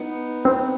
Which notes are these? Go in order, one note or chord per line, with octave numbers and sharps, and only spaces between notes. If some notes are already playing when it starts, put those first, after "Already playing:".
Already playing: B3 D#4
C4